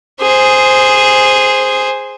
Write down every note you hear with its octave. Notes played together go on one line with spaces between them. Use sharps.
G#4 C5